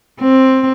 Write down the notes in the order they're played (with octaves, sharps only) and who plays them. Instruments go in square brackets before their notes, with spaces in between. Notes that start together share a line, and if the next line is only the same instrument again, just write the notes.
[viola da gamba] C4